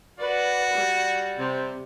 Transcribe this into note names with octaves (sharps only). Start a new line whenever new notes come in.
F#4 B4 D5
G3
C3